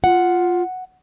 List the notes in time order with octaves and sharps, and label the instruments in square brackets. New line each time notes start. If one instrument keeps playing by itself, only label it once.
[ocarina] F4 [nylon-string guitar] F#5